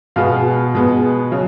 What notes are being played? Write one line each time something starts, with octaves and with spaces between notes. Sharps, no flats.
B2 G#3 B3 F5 F6
B2 G#3 B3
C#3 F#3